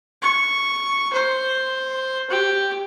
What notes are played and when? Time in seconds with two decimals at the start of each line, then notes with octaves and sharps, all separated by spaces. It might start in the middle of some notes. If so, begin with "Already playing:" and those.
0.22 C#6
1.13 C5
2.30 G4